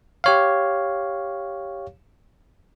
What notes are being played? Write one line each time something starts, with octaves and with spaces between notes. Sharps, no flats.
G4 C#5 F5